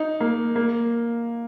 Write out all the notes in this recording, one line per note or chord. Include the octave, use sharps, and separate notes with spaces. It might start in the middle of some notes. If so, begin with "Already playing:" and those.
Already playing: D#4
A#3
A#3